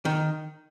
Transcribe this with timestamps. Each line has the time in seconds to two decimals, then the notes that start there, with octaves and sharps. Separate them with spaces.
0.05 D#3